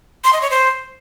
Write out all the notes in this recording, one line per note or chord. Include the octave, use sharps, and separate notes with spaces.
C6
D#5
C#5
C5